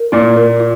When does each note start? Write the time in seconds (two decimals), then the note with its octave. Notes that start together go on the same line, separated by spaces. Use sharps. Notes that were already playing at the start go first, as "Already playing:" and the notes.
Already playing: A#4
0.12 A#2 F4
0.36 A#4
0.60 F4